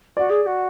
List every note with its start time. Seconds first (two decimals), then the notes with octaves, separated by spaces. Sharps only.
0.17 F#4 D5
0.29 G#4
0.42 G#4
0.46 F#4